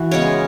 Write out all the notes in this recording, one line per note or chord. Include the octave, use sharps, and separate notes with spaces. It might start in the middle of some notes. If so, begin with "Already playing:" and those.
Already playing: E3 F#4
C#3 G#3 B3 C#5